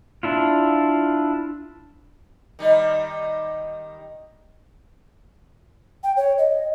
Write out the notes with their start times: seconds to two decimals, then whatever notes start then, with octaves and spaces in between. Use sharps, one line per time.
0.23 D4 E4 F4
2.59 D#3 G3 D#4
6.04 G5
6.17 C#5
6.38 D#5